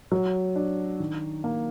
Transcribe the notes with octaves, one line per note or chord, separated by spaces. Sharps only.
F#3
D4
D#3
A#3